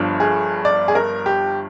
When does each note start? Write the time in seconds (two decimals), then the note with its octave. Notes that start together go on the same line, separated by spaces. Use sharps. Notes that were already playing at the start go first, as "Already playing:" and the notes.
Already playing: G1 G2 F3
0.20 G#4
0.65 D5
0.88 G#4
0.95 A#4
1.26 G4